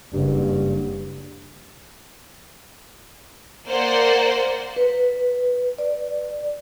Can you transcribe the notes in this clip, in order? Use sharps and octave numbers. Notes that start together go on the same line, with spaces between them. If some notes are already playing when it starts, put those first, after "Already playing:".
F#1 G2
A#3 C5 D5 F#5
B4
D5